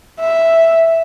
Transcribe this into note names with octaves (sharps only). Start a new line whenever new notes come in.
E5